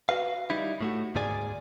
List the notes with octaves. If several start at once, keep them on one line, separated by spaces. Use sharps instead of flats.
F#4 B4 F5
G3 D#4 E4
A2 A3 F#4
D2 G#2 A#3 G#4 D5 G#5